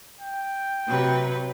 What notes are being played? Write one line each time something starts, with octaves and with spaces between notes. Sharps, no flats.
G5
C3 F#3 B4